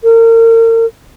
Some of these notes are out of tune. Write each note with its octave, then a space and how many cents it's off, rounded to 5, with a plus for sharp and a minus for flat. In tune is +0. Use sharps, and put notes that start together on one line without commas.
A#4 -35